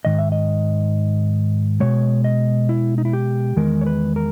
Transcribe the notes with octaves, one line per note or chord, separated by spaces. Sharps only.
G#2 D#3 D#5
E5
D#5
B2 G#3 C#5
D#5
E4
D#4
E4
G4
E2 D#3 G#3 A#4
C#5
B4
A#4